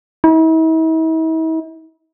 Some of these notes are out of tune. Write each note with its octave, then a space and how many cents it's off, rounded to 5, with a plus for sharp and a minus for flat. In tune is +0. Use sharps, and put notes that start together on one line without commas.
E4 -45